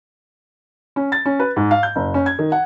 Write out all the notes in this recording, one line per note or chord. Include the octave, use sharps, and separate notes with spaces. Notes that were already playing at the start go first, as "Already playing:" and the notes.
C#4
A6
C#4
B4
G#2
F5
G6
F#1
C#4
G#6
D#3
F#5